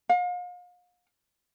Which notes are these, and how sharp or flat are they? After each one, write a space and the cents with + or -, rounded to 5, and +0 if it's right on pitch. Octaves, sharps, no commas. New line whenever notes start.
F5 +40